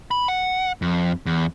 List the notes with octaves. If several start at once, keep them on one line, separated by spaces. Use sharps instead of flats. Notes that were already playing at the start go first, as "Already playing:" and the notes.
B5
F#5
F2
E2